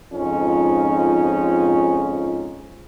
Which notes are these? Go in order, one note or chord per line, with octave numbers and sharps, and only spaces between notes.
F2 G#2 C#4 D#4 F4